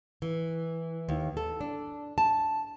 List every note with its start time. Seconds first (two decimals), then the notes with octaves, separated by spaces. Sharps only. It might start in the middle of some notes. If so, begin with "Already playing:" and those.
0.22 E3
1.09 D#2
1.37 A4
1.61 D4
2.18 A5